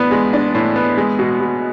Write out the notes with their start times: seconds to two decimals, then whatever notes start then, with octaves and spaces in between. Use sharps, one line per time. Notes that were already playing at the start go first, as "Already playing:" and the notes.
Already playing: A2 B3 D4
0.11 G#3
0.33 D4
0.55 A2
0.76 B3
0.97 G#3
1.19 B2
1.40 B2